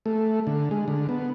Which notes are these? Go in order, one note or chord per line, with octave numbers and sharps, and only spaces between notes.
A3
D3
G#3
D3
B3